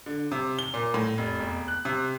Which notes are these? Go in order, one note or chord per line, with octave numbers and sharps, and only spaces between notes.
D3
C3
G7
A#2
A2
F1
E1
F#6
C3